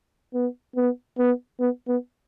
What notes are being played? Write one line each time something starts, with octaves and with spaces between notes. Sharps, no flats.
B3
B3
B3
B3
B3